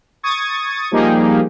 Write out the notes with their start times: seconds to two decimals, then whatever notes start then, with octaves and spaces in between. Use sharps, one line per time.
0.23 C#6 D#6 G#6 A6
0.91 F3 G3 A#3 D#4 G4 G#4